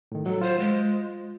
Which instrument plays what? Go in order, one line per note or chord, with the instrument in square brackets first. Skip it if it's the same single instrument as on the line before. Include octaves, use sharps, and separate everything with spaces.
[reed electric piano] A2 D#3
[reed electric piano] F#3 [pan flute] A4
[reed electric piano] F4 [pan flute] C5
[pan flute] G#3